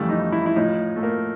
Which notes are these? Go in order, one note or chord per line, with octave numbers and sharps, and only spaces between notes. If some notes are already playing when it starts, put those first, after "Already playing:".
Already playing: F2 C#3 E3 G3 A3
D#4
E4
E4
A2 F3 D#4
A3
A#3